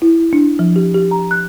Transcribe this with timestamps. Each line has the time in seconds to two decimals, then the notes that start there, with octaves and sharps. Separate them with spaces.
0.02 E4
0.33 D4
0.59 F3
0.76 G4
0.94 G4
1.11 A#5
1.31 F#6